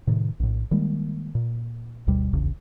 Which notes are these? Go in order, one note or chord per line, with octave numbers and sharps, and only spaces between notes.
A2 C3 D#3
A#1 A2
D#3 G3 G#3 A#3
A#2
G1 D2 B2 G3
D1 A#1 E2 C#3